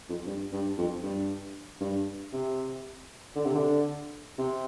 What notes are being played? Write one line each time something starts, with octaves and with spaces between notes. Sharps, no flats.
F2
G2
G2
F2
G2
G2
C3
D3
C3
D3
C3